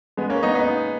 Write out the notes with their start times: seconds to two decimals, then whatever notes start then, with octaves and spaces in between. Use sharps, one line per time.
0.17 G#3 B3
0.30 A#3 C#4
0.43 B3 D#4
0.55 B3 D#4